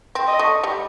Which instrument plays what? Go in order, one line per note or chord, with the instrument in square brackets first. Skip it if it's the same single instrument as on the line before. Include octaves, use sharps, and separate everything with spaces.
[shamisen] C4
[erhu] D#5
[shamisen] A3
G3